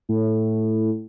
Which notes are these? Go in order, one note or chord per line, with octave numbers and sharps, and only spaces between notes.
A2